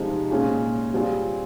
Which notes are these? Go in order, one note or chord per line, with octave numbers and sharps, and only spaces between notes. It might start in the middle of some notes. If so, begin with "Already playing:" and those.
Already playing: C3 F3 G#3 D#4
A#2 G#3 C#4 F4 G#4
G3 C4 F4 G#4